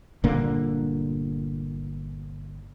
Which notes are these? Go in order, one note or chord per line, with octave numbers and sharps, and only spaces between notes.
G1 A#2 D3 A#3